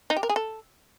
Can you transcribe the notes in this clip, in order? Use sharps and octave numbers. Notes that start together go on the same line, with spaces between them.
D#4
G4
A#4
G#4
A4